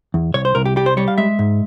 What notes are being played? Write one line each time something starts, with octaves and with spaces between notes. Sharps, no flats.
E2
C2 C#5
C5
C2 A#4
G4
G3 G4
C5
G3 C#5
F5
G#3 E5
G#2